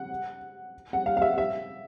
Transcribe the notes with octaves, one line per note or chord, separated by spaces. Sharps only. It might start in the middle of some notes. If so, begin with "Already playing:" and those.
Already playing: F#5
F#5
F5
F5
E5
E5